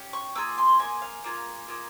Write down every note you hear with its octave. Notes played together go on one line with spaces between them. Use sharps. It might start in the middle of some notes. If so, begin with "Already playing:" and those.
Already playing: C#4 G4
C#6
A#3 F4 G#4 E6
C6
A#3 F4 G#4 G#5
F5
A#3 F4 G#4
A#3 F4 G#4